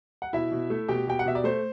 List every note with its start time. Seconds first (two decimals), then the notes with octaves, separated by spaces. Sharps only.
0.22 F#5
0.33 B2 E4 E5
0.52 B2
0.70 A3
0.88 B2 G4 G5
1.07 B2 G5
1.19 F#5
1.26 B2 E5
1.35 D5
1.44 A3 C5